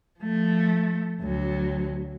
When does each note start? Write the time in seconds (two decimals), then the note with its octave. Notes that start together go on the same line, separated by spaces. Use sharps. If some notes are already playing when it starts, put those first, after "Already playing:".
0.20 F3 A3
1.21 D2 F#3